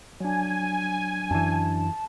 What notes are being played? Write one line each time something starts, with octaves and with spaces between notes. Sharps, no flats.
F#3 D4 G#5
F#2 E3 D4 A5